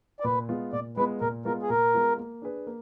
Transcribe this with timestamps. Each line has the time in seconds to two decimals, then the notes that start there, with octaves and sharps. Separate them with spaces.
0.20 D5
0.24 A#2 B4
0.49 G#3 B3 F4
0.73 A#2 D5
0.97 G#3 B3 F4 B4
1.21 A#2 A#4
1.45 G#3 B3 F4 A#4
1.63 G#4
1.70 A#2 A#4
1.94 G#3 B3 F4
2.18 A#3
2.42 D4 G#4 B4
2.67 A#3